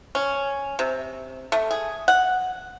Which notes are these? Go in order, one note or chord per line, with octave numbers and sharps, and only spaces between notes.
C#4
C3
A3
G#4
F#5